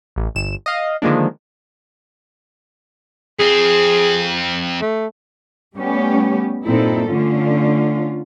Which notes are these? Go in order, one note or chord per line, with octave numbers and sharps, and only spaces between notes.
A1
G1 E7
D#5 F5
D3 D#3 F3 G#3 A#3 D4
F2 C4 G#4
A3
G3 A3 B3 C#4 G4
G2 A#2 C4 D#4 E4 A4
D3 A3 C#4 F4